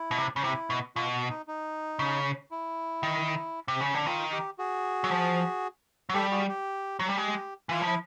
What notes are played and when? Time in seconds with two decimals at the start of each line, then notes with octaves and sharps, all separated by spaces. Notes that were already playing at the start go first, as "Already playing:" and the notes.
Already playing: E4
0.11 B2
0.18 C3
0.36 C#3
0.44 C3 E4
0.70 B2
0.96 B2 F4
1.13 F#4
1.30 D#4
1.48 D#4
1.99 C#3
2.51 E4
3.03 D#3
3.68 C3
3.81 C#3
3.94 D3
4.06 D#3 F4
4.32 G4
4.58 F#4 G#4
5.04 F#3
5.11 F3
6.09 F#3
6.14 G3 G4 A4
6.31 F#4 G#4
6.49 G4
7.00 F#3
7.09 G3
7.17 G#3 G4
7.69 E3 F4
7.81 F3
7.87 E4